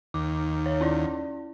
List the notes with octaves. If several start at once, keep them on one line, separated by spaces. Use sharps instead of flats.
D#2 D6
C#5
C#4 E4 D5